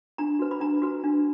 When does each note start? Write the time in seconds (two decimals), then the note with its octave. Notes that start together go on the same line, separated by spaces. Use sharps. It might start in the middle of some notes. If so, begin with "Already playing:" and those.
0.18 D4 A#5
0.39 F#4 B4
0.51 B5
0.60 D4 A#5
0.82 F#4 B4
1.04 D4